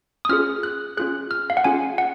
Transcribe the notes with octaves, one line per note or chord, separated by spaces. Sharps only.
D#6
C#4 F4 G#4 F6
F#6
C#4 F4 G#4 F#6
F6
F5
F#5
C#4 F4 G#4 G#5
F#5